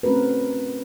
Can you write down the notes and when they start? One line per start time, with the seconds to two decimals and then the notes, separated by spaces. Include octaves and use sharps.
0.03 A3 C4 C#4 F#4 A#4 B4